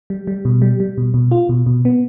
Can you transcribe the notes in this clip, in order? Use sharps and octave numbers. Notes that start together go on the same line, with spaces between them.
G3
G3
B2
G3
G3
B2
B2
F4
B2
B2
B3